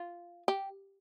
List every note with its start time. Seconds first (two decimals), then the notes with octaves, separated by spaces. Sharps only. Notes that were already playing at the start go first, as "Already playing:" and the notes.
Already playing: F4
0.48 G4